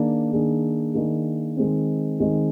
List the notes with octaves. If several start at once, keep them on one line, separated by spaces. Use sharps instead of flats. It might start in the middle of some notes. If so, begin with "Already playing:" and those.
Already playing: D#3 A#3 D4 G#4
D#3 A#3 D4 G#4
D#3 A#3 D4 G#4
D#3 G#3 C4
D#3 G#3 C4